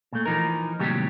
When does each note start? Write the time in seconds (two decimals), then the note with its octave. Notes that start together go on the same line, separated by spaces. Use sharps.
0.12 A#2 A3
0.26 E3 F3 D#4 A#4
0.79 D#2 A2 C3 F#3 G3 G4